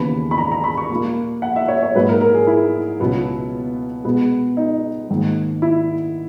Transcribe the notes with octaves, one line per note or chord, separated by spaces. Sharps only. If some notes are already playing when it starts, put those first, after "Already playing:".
Already playing: D#2 C#3 E3 B3 B5
B5
A#5
A#5
B5
C#6
A#2 A#3
F#5
E5
C#5
C#5
G#2 F#3 A#3 B4
A#4
A#4
G#4
E4
C#2 B2 F#3 B3
B2 G#3 B3
D#4
G#2 D#3 A#3
E4